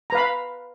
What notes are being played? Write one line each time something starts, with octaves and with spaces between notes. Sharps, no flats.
B4 F5 A#5 B5